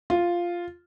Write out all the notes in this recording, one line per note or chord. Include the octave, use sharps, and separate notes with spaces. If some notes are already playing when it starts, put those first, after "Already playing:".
F4